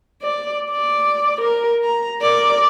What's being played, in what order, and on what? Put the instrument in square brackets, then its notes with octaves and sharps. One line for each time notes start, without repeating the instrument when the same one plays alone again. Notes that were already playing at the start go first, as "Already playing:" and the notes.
[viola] D5
D5
A#4
A#5
A#4 D5